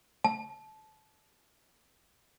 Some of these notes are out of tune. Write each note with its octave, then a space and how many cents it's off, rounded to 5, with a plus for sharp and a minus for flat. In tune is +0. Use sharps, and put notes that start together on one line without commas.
A5 -20